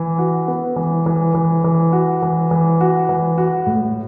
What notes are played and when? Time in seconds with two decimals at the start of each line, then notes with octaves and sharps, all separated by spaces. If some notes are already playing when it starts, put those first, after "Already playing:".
Already playing: E3
0.18 F#4
0.48 B3
0.76 E3
1.06 E3
1.35 E3
1.64 E3
1.92 F#4
2.22 E3
2.51 E3
2.80 F#4
3.09 E3
3.38 F#4
3.67 A2